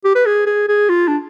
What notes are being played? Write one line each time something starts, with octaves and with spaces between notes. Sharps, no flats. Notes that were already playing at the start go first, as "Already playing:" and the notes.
G4
B4
G#4
G#4
G#4
F4
D4